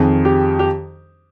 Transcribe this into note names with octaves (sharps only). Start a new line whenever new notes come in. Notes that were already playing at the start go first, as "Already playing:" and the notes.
Already playing: F2 D#3 G#4
G4
G4